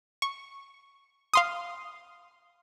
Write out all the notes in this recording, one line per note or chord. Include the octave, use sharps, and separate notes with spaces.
C#6
F5 C6 D#6